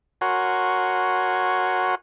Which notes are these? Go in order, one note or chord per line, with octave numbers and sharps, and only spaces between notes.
F#4 A#4 C#5 F#5 G#5 C6